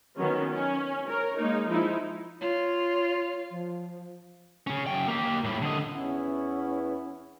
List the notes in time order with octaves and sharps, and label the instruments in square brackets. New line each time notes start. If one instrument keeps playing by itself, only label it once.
[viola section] D#3 F#3 B3 C#4
C#4
A#4 C#5
G#3 A#3 D#4
F3 G#3 D#4 E4
[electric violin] F4 [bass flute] C#5
[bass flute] F3
[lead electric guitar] C#3 C#4
F#2 G5
A#3 G4
A2 G3
D3 D#5
[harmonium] E2 B3 E4 [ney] C#4